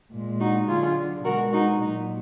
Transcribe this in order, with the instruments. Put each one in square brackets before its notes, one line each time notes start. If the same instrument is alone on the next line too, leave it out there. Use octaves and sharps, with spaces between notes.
[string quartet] A#2 G#3
D#4 F#4
D3 F#3 F4 G#4
B2 G#3 F#4 A#4
D#4 F#4
A#2 F#3 D#4